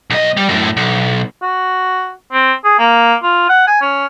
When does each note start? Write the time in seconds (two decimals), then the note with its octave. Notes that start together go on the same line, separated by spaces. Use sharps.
0.10 B1 D#5
0.37 G3
0.49 F#2 A2
0.77 B1
1.43 F#4
2.33 C4
2.65 G#4
2.79 A#3
3.23 F4
3.49 F#5
3.68 G#5
3.82 C#4